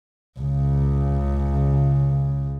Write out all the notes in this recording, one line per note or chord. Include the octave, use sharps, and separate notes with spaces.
C#2 C#3